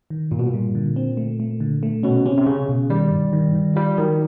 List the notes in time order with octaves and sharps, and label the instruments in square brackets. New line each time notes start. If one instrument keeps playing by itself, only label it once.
[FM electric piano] D#3
[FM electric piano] G2 [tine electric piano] A#2
[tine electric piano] B2
A#2
[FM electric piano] G3
D3
C4
A3
A3
D3
A3
[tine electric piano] B2 [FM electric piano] C#4
[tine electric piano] C3 [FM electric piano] C#4
[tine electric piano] C3
[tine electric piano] C#3 [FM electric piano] C#4
[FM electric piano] B2
[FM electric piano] D#3 [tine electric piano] G3
[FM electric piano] G2
D#3
D#3
[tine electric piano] G3 [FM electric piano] F4
[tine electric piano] D#3 [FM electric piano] F#3